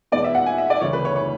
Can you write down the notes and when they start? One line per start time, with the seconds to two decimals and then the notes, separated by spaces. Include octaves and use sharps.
0.12 E2 B2 G#3 B3 D5
0.24 E5
0.35 F#5
0.46 G#5
0.58 E5
0.70 D5
0.81 D2 C#3 E3 C#5
0.93 B4
1.05 C#5
1.16 C#5